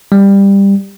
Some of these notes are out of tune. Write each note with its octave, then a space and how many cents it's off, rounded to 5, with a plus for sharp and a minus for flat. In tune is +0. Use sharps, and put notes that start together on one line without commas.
G3 +15